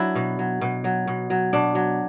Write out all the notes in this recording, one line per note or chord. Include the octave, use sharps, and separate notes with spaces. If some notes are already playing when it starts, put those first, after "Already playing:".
Already playing: F#3 D4 E4 F#4
B2
F#3
B2
F#3
B2
F#3
B2 D4
F#3